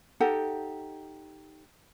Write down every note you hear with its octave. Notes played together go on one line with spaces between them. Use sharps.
D#4 G4 A4 F#5